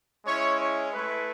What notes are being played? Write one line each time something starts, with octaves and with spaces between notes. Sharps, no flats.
G#3 C#4 E4 C#5
C#5
A3 E4 B4